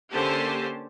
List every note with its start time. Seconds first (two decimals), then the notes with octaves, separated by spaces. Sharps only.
0.11 D3 A#3 C#4 G4 C5 A5